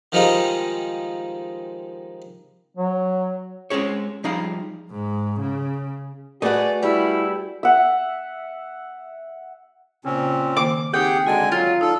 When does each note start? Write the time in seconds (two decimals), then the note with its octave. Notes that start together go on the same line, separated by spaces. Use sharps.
0.12 D#3 F3 G3 G#3 D#4 F4
2.76 F#3
3.70 G#3 C4 C#4 G#4 C#5
4.24 F3 G3 D#4 G#4 F5
4.91 G#2
5.40 C#3
6.42 A3 F#4 G#4 B4 D5 D#5 F#5
6.83 G3 E4
7.63 E5 F#5
10.05 A#2 C#3 C4 C#4
10.57 D#3 A#3 C5 D6
10.94 C4 D#4 G4 G#4 F#5 G5
11.27 D3 G#3 F#4 A4 G#5 A5
11.52 F#3 F4
11.81 D#4 A4 D5